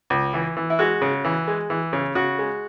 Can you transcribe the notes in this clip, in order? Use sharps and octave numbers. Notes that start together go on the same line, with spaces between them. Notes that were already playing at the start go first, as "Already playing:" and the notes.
C#2
E3
E3
E4
G#3 F#4
C#3
E3
G#3
E3
C#3
C#3 F#4
G#3